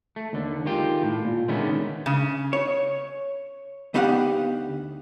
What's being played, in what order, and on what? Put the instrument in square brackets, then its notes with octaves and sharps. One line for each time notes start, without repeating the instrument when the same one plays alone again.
[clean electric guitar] A3
D#2 D3
D#3 G#3 F4 G4
A2
A#2
D3 D#3 G#3 A3 B3 C#4
[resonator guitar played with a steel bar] C#3
[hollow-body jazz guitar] C#5
D2 B3 D#4 G4 F5 F#5